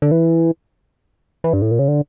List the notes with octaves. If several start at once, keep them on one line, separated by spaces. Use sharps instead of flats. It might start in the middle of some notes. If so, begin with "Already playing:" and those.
D3
E3
E3
G2
A2
A#2
C#3
D3